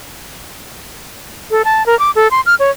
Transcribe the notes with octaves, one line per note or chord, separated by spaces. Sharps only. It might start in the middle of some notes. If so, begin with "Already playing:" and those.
A4
A5
A#4
D6
A4
C6
F6
C#5